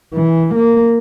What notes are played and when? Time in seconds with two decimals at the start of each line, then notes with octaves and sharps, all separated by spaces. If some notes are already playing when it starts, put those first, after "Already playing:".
0.14 E3
0.55 A#3